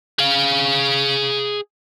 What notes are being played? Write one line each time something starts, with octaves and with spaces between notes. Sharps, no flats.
G#4 F5